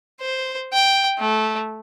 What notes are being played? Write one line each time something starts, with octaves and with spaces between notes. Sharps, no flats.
C5
G5
A3